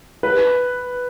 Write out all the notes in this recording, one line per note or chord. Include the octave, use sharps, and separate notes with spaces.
B4